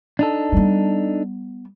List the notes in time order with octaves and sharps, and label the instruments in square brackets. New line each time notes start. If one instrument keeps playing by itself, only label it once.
[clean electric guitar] D4 D#4 A4
[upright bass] G3 B3